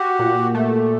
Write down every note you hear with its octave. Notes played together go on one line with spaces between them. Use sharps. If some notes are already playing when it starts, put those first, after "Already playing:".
Already playing: F#4 G4
A#2
A3